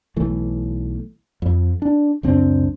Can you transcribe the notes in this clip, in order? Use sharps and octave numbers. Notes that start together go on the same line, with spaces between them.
B1 E3 A3
F2
D4
C#2 F#2 C4 D4